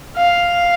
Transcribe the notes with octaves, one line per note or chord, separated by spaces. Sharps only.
F5